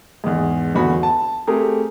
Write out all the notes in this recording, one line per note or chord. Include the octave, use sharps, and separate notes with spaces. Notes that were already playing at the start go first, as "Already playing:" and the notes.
E2 G#2
G1 E2 F#4 B5
A5
A3 C4 G4 G#4 A#4